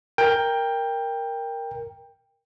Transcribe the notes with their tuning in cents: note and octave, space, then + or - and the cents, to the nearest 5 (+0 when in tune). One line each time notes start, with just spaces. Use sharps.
A#4 +0 G5 +15